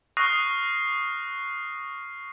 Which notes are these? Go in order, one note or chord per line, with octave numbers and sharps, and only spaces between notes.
C#6 D#6 F6 F#6 A#6 C7